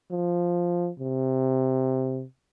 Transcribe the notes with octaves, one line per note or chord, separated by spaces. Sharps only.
F3
C3